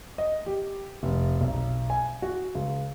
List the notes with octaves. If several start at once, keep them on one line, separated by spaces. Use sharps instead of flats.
D#5
G4
F1
B1
G#5
F#4
C#2